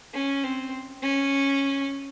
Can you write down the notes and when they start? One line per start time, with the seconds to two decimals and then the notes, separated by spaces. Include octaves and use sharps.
0.14 C#4
0.43 C4
1.03 C#4